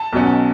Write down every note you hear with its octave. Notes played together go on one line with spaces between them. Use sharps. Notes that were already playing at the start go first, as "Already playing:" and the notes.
Already playing: A5
B1 B2 F#3 C#4